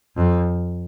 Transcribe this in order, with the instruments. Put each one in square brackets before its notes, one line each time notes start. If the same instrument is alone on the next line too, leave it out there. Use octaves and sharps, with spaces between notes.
[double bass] F2